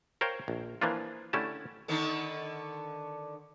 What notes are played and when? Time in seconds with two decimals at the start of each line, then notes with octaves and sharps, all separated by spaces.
0.21 A#4 C5 C#5 F5 G5
0.48 A#1
0.82 E3 F3 A#3 D4 F4
1.33 D3 A3 C#4 E4 G4 A5
1.88 D3 D#3 B3